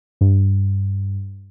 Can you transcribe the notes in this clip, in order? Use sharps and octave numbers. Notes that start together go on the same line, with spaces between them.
G2